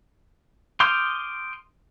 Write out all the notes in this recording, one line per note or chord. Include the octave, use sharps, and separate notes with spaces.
C6 D6 D#6 F6 G6